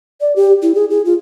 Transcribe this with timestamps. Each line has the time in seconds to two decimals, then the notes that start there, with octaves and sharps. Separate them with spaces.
0.21 D5
0.36 G4
0.62 E4
0.75 G#4
0.90 G#4
1.05 F4